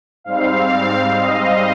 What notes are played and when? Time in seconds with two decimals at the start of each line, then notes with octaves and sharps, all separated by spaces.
0.24 G#2 G3 C4 F5
1.16 D#5